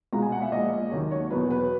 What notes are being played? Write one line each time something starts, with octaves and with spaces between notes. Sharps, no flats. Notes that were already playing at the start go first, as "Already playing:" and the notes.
C#2 B2 G#3 A#5
G#5
F#5
E5
A#1 A#2 G#3 D#5
D#2 D#3 F#3 C#5
C#5
E2 B2 F#3 B4
B4